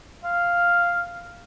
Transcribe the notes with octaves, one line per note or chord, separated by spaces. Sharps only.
F5